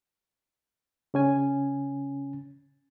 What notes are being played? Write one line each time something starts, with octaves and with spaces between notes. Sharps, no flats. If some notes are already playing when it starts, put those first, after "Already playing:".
C#3 C#4 G#5